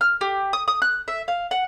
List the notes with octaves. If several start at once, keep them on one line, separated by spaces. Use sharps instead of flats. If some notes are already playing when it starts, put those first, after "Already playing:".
F6
G4
D#6
D#6
F#6
E5
F5
F#5